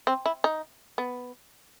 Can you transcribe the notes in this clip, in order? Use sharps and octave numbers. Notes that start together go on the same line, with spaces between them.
C4
E4
D#4
B3